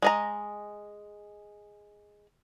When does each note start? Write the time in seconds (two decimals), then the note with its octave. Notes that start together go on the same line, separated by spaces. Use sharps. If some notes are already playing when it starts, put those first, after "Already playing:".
0.02 G#3 D#5 A#5